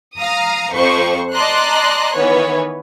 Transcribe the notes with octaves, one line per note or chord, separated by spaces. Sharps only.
F5 A#5 D#6
F2 C5 C#6
D5 D#5 A5 A#5 C6 F#6
D#3 E3 B3 B4 C#5